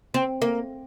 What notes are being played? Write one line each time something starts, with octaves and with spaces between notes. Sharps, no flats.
C4
A#3